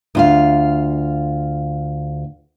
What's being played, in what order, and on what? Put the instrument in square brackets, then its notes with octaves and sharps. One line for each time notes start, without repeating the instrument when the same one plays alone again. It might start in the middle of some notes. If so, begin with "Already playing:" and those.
[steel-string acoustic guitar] D2 F4 F5